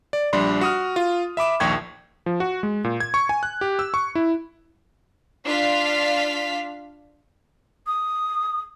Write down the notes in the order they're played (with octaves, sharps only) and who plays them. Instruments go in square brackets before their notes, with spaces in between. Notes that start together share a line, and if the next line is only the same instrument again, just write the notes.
[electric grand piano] D5
A#1 G3 D4 B5 C6
F#4 D#6 F6
F4
E5 B5 D6 E7
A#1 D#2 G5 C#6 G#6
F3
F#4
G#3
A#2
G#6
C#6
G#5
F#6
G4
E6
C#6
E4
[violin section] D4 F4 F5 B6
[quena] D#6